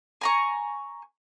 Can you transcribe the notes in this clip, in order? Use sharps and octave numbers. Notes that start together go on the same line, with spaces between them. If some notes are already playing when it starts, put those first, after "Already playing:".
G#5 A#5 C#6